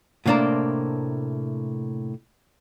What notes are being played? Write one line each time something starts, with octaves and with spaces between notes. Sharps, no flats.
A2 C3 A#3 D4 C5 A#5